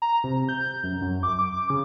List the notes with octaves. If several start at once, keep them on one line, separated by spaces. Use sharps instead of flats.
A#5
C3
G6
F#2
F#2
D6
D6
C#3